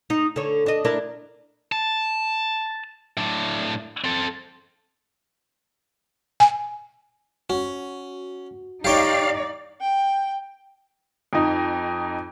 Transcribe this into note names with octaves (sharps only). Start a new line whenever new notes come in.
D#4
D3 C#5
D4 D#5
D4 E4 A#4
A5
A2 D4
C4 A4
G#5
C#4 F#4
D#4 G4 C#5 D5 F5 G5
G5
F2 D#4